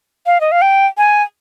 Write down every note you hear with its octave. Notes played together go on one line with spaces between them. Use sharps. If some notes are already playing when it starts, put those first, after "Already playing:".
F5
D#5
F5
G5
G#5